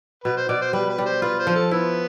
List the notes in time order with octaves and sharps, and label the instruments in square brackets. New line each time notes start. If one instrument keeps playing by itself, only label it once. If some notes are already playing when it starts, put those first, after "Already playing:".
[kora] B2 [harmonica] B4
[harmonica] C5
[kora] B2 [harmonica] D5
[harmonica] C5
[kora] G3 [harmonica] B4
[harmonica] B4
[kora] G3
[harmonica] C5
[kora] F4 [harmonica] B4
[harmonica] C5
[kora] F3
[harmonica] A4
[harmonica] B3 [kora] E4